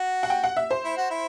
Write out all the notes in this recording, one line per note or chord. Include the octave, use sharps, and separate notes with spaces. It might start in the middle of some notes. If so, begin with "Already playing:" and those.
Already playing: F#4
F#5
G5
F#5
E5
C5
E4
F#4
E4